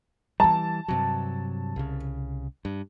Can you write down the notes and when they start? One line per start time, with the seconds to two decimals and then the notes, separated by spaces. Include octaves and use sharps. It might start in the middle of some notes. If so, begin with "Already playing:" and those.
0.40 E3 G3 A5
0.88 G2 C3 F#3
1.76 C2 C#3
2.65 G2